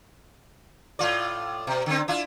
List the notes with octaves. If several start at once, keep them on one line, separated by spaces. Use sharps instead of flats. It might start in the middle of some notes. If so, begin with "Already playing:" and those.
A2 F4 D5
B2
D3 C4
D4 E4 F4